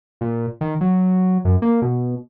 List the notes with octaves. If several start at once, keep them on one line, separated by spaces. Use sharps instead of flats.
A#2
D#3
F#3
F#2
A#3
B2